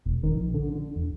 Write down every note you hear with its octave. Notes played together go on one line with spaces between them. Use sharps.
E1
D#3
A#1
D3
D3
E1